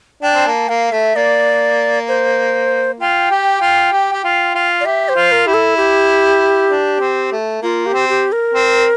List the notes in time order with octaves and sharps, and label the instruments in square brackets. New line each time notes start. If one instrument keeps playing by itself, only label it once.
[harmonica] D4 [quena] G5
[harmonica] C4
[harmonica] A#3 [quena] A5
[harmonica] A#3 [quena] F5
[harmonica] A3 [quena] E5
[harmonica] A#3 [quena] D5
[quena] C5
[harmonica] F4 [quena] G5
[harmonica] G4
F4
G4
G4
F4
F4
[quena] D5
[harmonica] G4 [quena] E5
[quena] C5
[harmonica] F4
[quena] A#4
[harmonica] E4 [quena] G4
[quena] A4
G4
[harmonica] D4
C4
A3
[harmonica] A#3 [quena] F4
[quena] G4
[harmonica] C4
[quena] G4
A#4
[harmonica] C4